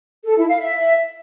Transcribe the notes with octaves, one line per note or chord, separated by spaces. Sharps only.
A4
E4
F5
E5